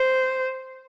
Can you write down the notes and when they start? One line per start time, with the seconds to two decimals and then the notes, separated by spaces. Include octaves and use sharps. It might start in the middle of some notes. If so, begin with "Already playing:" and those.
Already playing: C5